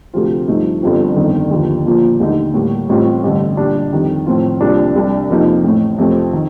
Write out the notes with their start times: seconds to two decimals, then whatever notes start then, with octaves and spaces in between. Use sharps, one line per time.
0.14 D2 C3 F3 C4 F4
0.48 G2 F3 A3 D#4
0.82 G1 G2 F3 C4 F4
1.16 G1 F2 D#3
1.51 D#2 D3 F3
1.85 A#2 F3 A#3 F4
2.20 D#2 D3 A3 D#4
2.54 A2 G3 A#3
2.89 A1 A2 G3 C4 F4
3.23 A1 G2 D3
3.57 A#2 G3 D4
3.92 F2 D#3 G3
4.26 A2 F3 C4 F4
4.61 C2 C3 F3 A#3 D4
4.95 C2 C3 G3 D4
5.30 F2 C3 F3 A#3 D#4
5.63 A1 A2 A3
5.98 F2 C3 F3 A3 C4
6.33 D#3